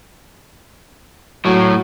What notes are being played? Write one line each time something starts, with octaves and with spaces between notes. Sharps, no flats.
A2 F#3